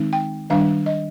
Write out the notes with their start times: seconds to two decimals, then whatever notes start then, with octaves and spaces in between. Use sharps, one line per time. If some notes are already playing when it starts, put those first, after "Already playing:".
Already playing: D#3 G#3 C4 D#4
0.13 G5
0.50 D#3 G3 D4 F5
0.86 D#5